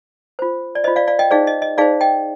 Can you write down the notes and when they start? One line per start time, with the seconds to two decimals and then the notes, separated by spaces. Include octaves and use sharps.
0.39 F4 C5
0.75 D5
0.84 F4 C5 D#5
0.96 D5 F5
1.07 D5 F5
1.19 D#5 G5
1.31 D#4 G#4 C5 D5 F5
1.47 D#5
1.62 D#5
1.78 D#4 G#4 C5 D5 F5
2.01 D#5 G5